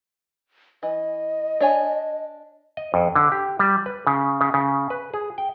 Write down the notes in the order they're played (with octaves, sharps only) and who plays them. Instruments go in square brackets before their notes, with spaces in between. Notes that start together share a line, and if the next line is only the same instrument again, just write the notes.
[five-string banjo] E3 [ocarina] D#5
[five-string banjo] D4 C#5 G#5
[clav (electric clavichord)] D#5
F2
D3
G4
G3
B4
C#3
C#3
C#3
B4
G#4
G5